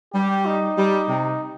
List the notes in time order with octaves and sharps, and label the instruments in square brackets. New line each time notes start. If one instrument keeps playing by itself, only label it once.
[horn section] G3 [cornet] G4
[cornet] D#4
[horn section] G3
C3